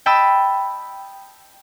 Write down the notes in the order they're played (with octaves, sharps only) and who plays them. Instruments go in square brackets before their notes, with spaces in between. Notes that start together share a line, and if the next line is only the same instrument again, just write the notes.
[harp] D#5 G5 A5 B5 E6